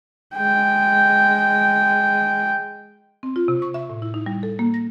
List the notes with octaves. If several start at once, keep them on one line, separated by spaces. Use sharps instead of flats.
G#3 G5
C4
F4
C3
C#6
E5
A2
E4
D#4
G3
A4
A#3
A#6